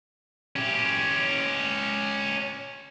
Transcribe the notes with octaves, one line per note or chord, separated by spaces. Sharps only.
C#4 G4